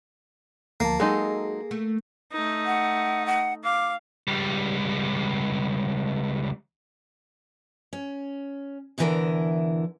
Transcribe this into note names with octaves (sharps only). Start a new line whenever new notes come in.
D2 F3 A#3 A5
F#3 G#3 D#4 G#4 A4
A3
A3 D#4
F#5
F#5
F5 D6
C#2 G3
C#4
E2 B2 D3 E3 E4 A#4